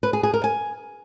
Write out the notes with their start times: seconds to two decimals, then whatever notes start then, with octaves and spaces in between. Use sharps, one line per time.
0.03 B4
0.13 G#4
0.23 G#4
0.34 A#4
0.44 G#5